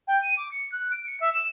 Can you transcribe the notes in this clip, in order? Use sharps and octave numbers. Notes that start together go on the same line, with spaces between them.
G5
D#7
D6
C#7
F#6
D7
C#7
E5
E7